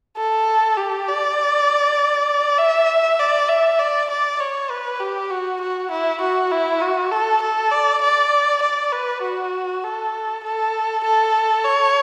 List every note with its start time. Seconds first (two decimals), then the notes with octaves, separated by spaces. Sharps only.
0.17 A4
0.77 G4
1.08 D5
2.58 E5
3.19 D5
3.49 E5
3.79 D5
4.10 D5
4.40 C#5
4.70 B4
5.00 G4
5.30 F#4
5.61 F#4
5.91 E4
6.21 F#4
6.51 E4
6.81 F#4
7.11 A4
7.42 A4
7.71 D5
8.02 D5
8.62 D5
8.93 B4
9.23 F#4
9.84 A4
10.44 A4
11.04 A4
11.65 C#5